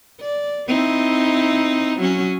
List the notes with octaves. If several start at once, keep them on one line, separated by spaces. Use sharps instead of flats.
D5
C4 D#4 E4
F#3 C#4